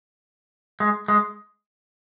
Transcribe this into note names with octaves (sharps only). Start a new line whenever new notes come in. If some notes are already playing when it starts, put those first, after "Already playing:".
G#3
G#3